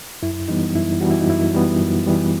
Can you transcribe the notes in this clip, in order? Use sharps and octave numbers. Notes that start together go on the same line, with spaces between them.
F#2 E4
E3 G3 B3 D#4
F#2 E4
E3 G3 B3 F#4
E4
D#4
F#2 E4
E3 G3 B3
F#2
E3 G3 B3